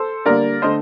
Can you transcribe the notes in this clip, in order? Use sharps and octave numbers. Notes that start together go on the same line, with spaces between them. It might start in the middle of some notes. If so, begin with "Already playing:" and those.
Already playing: A4 C5
D3 G3 A#3 A#4 D5
D3 A3 C5 D#5